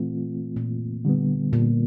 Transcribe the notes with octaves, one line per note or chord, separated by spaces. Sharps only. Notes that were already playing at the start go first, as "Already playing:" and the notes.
Already playing: A#2 E3 A3 C4 F4
A#2
D3 G3 B3
A#2